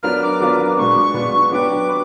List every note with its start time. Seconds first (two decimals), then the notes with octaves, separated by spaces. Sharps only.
0.03 F#3 B3 D4 F4 A#4 F6
0.22 D6
0.40 F#3 B3 D4 F4 A#4
0.77 B2 G#3 B3 D4 C#6
1.14 B2 G#3 B3 D4
1.51 F#3 B3 D4 G4 B4 D6
1.89 B4